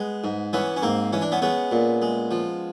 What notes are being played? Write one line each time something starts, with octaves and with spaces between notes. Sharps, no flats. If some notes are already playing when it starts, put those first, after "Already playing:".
Already playing: G#3 B3
G#2
E3 B3 C#4
C#4
G#2 A#3 C4
E3 C#4
D4
B3 C#4
G#3 B3 C#4
A#2
G#3
F3